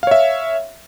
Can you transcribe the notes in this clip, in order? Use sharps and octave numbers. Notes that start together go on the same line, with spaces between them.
C#5 E5 F5